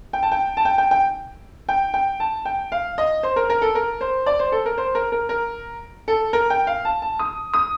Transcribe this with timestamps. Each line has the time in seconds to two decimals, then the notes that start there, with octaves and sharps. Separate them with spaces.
0.13 G5
0.23 A5
0.32 G5
0.57 A5
0.65 G5
0.78 G5
0.91 G5
1.69 G5
1.94 G5
2.20 A5
2.45 G5
2.72 F5
2.98 D#5
3.23 C5
3.36 A#4
3.50 A#4
3.62 A4
3.75 A#4
4.01 C5
4.26 D5
4.39 C5
4.52 A4
4.66 A#4
4.78 C5
4.95 A#4
5.12 A#4
5.29 A#4
6.08 A4
6.33 A#4
6.50 G5
6.67 F5
6.85 A5
7.02 A5
7.19 D#6
7.54 D#6